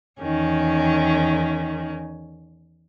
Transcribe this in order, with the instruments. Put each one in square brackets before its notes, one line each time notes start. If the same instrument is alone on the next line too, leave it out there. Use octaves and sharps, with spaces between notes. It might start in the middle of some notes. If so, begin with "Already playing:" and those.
[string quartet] E2 D#3 C#4